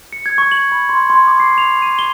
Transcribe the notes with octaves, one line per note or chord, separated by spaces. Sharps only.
C#7
G#6
C#6
F#7
B5
C6
C6
D6
C7
F7
D#7
G7